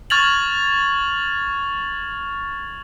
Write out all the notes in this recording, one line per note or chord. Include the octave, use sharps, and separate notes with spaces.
C#6 F6 G#6 A6 F7 F#7